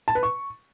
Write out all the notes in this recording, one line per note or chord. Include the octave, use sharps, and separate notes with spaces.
A5
B4
C#6